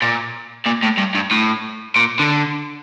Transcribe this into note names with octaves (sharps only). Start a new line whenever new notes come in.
A#2
A#2
A2
G2
G2
A2
A#2
D3